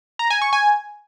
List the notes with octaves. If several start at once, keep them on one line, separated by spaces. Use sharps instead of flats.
A#5
G#5
C#6
G#5